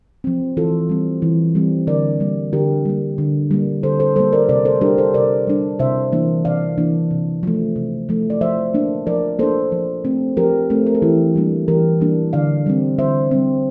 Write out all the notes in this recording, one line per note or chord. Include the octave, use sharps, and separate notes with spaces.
F3 C4
E3 F4 A4
G3 C4
E3
G3 C4
D3 A#4 D5
G3 A#3
D3 G4 A#4
G3 A#3
D3
G3 A#3
D3 A4 C5
A4 C5
G3 A#3 A4 C5
A#4 D5
C3 A#4 D5
A4 C5
G3 D4 G4 A#4
A4 C5
C3 A#4 D5
G3 D4
C3 C5 E5
E3 A#3 D4
C3 D5 F5
E3 A#3 D4
C3
F3 A3
C3
F3 A3
D5
F3 C5 E5
A#3 D4
F3 A#4 D5
A#3 D4 A4 C5
F3
A3 C4
F3 G4 A#4
A3 C4
A#4
A4
E3 E4 G4
G3 A#3 D4
E3 G4 A#4
G3 A#3 D4
D3 D5 F5
G3 C4
D3 C5 E5
G3 C4